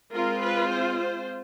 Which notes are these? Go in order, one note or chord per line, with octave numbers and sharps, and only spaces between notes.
G#3 C4 F4 A#4
B4
C5
C5